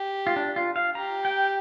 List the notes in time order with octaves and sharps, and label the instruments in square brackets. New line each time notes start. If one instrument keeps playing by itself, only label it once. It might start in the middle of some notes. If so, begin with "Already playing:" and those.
Already playing: [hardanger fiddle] G4
[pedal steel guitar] F4
D4
F4
F5
[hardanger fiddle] G4 [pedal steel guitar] A#5
[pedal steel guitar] G5